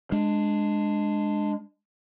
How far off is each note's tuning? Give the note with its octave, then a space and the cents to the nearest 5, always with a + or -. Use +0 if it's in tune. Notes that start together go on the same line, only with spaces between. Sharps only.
G#3 +0 D4 +10